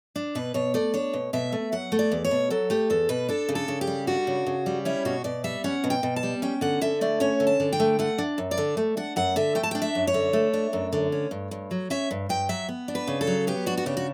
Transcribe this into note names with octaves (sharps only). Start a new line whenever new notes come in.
D4
B2 B4
B2 C#5
A3 D5
D4 C#5
B2
B2 E5
A3
F#3 F#5
A3
D5
E2
C#5
B2
F#3 A4
A3 G4
E2 A4
B2 B4
D4 A4
C#3
A4
C#3
G4
G3
D4 F#4
C#3
C#3
G3
C#4 E4
B2 F#4
B2 D5
G3 E5
C#4 F#5
B2
G5
B2
A5
G3
C#4 G5
D3 F#5
D3 E5
A3 D5
C#4 C#5
D3
A5
D3
G5
A3
A3 F#5
D4
F#2
D5
D3
A3
D4 F#5
F#2 F#5
D3 E5
A3 G5
A5
D4 G5
E5
F#2
C#5
D3
A3
D4
F#2
D3
C#4
G2
G2
F#3
C#4 E5
G2
G2 G5
F#3 E5
B3
D4
B4
C#3
A4
F#3
B3 G4
D4 F#4
F#4
C#3 G4
F#4